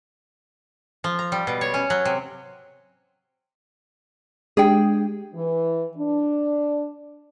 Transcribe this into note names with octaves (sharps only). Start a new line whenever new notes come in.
F3
A#5
G3
B2
C#5
C#4
F#3
C3
G#3 D4 G4 G#4 G5
E3
D4